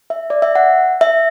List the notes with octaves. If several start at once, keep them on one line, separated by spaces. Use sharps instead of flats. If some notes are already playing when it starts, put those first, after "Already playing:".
E5
D5
E5
F#5
E5